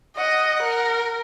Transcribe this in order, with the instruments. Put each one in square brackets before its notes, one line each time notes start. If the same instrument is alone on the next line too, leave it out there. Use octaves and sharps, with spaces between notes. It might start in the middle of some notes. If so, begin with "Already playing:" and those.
[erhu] D#5 [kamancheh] F#5
[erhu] A#4